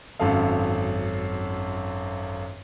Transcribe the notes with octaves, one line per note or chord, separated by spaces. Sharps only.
G#1 F#2 A4 F5